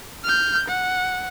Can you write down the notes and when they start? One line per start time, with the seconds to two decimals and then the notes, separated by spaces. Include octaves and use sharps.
0.24 F6 G6
0.68 F#5